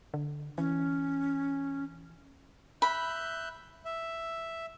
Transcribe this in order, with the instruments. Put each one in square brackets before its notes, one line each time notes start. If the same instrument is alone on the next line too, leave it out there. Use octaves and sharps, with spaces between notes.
[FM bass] D3
[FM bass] E3 [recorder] C#4
[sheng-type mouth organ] E5 F#6 G6 [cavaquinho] B5
[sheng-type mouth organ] E5